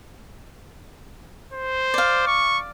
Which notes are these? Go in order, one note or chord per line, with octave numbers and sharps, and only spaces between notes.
C5
D5 F5
C#6